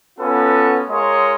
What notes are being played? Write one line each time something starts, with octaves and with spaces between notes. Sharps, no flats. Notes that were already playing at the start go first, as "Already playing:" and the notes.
B3 C#4 F4 F#4 A4 B4
G#3 F4 A#4 C#5 D#5 C6